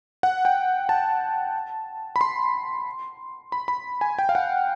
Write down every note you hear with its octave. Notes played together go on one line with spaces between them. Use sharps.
F#5
G5
A5
B5
C6
B5
B5
G#5
G5
F5
F#5